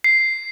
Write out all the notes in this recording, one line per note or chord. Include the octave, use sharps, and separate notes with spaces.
C7